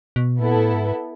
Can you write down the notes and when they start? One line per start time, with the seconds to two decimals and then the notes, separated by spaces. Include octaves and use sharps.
0.16 B2
0.39 A#2 B3 E4 A4
0.56 A2
0.74 G#2